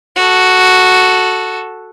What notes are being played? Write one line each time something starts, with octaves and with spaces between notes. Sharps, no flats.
F#4 A4